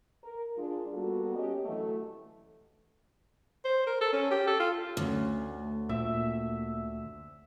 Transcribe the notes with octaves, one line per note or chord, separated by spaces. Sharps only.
A#4
G#3 D4 F4
G3 A#3 B3 F#4 A4
C#4 G4 D#5
D3 E3 F#3 A3
C5
A#4
A4
C#4
G4
A4
F4
D2 A3 C#4
A#2 C4 E5